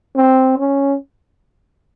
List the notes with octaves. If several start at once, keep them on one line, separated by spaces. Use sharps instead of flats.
C4
C#4